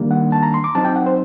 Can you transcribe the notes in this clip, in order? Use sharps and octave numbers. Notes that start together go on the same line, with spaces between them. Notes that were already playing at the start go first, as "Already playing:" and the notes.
Already playing: D#3 G3 A#3 D4
F#5
A5
A#5
C6
D6
F#3 C4 D#4 A5
G5
F#5
C5